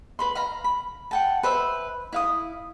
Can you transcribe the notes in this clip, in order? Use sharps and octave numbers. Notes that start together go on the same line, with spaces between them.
B4 B5 C6
F5 A#5 B5
B5
F#5 G5 A5
B4 C5 E5
E4 F5 D#6